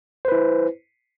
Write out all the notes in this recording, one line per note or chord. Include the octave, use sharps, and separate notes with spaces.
E4 B4 C5